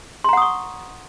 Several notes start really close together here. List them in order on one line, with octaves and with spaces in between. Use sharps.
C6 A#5 F#5 D#6 C#6